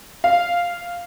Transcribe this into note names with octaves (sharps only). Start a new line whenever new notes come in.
F5